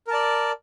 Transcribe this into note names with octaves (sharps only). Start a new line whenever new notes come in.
A#4 D5 A5